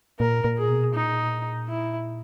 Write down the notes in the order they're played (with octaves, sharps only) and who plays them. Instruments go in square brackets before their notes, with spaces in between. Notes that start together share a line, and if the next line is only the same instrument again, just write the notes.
[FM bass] A#2 [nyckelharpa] A#4
[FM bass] A#2
[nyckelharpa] G#4
[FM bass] B2
[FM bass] A#2 [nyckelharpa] D#4
[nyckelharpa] E4